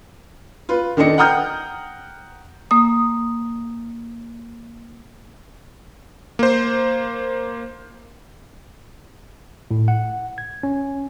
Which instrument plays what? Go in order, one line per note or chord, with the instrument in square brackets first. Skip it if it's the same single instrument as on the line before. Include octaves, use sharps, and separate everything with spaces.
[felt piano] F4 B4
D#3 D4 A4 D#5 C#7
F#5 G5 A#5 D#6 F6 G6
[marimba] A#3 D#6
[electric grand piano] A#3 C5
[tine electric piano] A2
F#5
G#6
C#4